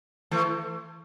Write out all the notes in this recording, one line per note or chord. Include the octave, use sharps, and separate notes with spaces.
E3 A3